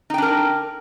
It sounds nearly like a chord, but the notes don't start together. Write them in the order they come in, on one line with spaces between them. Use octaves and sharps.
D#4 G5 D4 A#4